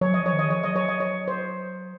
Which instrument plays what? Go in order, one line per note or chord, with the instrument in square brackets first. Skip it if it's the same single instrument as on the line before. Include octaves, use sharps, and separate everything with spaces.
[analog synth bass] F#3 [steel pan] C#5
[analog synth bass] F3 [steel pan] D#5
[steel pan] C#5
[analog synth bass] D#3
[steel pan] D#5
[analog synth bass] F3 [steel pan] C#5
[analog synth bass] F#3 [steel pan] D#5
[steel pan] C#5
D#5
C#5
C5